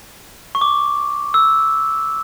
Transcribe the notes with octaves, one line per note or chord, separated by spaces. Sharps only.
C#6
D6
E6